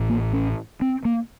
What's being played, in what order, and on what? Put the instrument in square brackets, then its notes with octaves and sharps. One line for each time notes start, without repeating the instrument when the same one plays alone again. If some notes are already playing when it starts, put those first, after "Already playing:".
Already playing: [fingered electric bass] A1 A2
A#3
C#4
C4
A#3